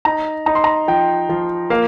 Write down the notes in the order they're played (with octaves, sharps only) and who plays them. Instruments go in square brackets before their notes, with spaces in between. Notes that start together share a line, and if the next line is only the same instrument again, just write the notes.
[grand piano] D#4 A#5
D#4 A#5
C6
A#5
F3 G5
F3
A#3 F5